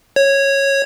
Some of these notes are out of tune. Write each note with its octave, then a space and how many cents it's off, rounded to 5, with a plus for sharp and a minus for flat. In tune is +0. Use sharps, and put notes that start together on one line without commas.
C#5 -10